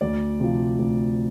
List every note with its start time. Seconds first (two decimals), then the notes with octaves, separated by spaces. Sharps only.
0.01 D2 D5
0.40 C3 F3
0.79 D2